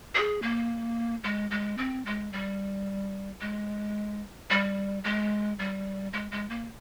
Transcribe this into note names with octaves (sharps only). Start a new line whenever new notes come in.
G#4
A#3
G#3
G#3
C4
G#3
G3
G#3
G3
G#3
G3
G#3
G#3
A#3